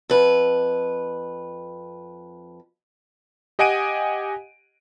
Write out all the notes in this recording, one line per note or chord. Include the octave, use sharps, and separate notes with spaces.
F2 B4
G4 D#5 F#5 G#5 D7 D#7